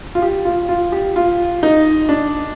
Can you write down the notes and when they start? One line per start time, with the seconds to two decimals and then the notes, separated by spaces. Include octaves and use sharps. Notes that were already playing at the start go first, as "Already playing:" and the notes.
0.15 F4
0.22 G4
0.45 F4
0.69 F4
0.92 G4
1.16 F4
1.63 D#4
2.09 D4